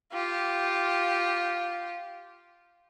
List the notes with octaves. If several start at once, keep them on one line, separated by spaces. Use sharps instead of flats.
F4 G4